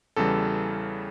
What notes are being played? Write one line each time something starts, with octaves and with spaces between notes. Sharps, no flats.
E2 C#3 E3 G3 A4